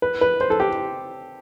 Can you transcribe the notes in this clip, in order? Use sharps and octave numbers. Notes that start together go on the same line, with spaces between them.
B4
B4
C5
A4
G4